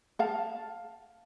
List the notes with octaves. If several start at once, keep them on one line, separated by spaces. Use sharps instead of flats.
F5 A5